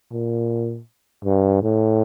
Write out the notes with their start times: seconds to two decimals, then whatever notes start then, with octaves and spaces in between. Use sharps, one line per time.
0.12 A#2
1.25 G2
1.62 A2